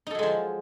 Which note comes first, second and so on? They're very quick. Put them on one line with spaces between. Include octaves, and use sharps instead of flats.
D#4 A4 F#3 G#3 F3